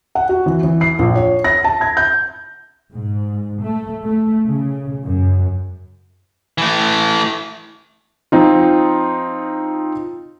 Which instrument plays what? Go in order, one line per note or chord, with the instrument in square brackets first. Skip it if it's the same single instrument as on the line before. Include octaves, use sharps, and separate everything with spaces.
[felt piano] F#5
F#4
E3
E3
C7
A#1
C#5
A#6
A5
G#6
G6
[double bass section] G#2
A3
A3
C#3
F#2
[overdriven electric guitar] E3 A3
[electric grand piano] F3 C4 D#4 F4